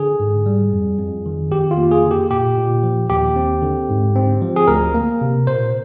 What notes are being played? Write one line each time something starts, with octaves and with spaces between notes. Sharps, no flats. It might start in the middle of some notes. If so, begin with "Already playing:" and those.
Already playing: D3 G#4
G#2
G3
F2
F2
D#3
F2 G4
F4
A#3
G#4
D3
G4
A#2 G4
A#2
F3
D#2 G4
C4
D3
G#2
C4
F3
G#4
D2 A#4
A#3
C3
A#2 C5